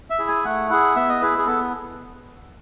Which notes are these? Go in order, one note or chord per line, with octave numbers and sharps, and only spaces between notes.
E5
E4 G#4
G#5
A3 F#5
E4 G#4 F#5
B3 E5
D#5
E4 G#4 B4
G#4
B3 A4